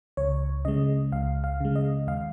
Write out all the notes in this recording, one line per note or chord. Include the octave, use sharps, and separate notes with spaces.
C#2 C#5
C#3 G#3 D#5
C#2 F5
F5
C#3 G#3
D#5
D#2 F5